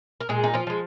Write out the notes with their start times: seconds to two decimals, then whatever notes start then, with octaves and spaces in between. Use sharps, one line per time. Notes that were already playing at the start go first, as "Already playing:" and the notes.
0.21 A#4
0.29 A#2 G#3 G#4
0.44 D#4
0.54 F3 F4
0.67 F3 G#3